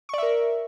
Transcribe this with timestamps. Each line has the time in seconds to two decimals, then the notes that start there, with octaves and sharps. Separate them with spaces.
0.09 C#6
0.14 D5
0.18 E5
0.23 A#4